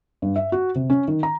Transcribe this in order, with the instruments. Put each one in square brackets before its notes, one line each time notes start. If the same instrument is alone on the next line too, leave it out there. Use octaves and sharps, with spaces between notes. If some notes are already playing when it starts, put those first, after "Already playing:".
[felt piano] G2
E5
F#4
C3
C#4
D#3
A#5